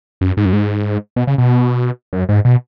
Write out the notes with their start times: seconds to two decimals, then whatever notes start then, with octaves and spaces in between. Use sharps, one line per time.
0.21 F#2
0.37 G#2
0.45 F#2
0.53 G#2
1.16 B2
1.27 C#3
1.38 B2
2.13 F#2
2.29 G#2
2.45 B2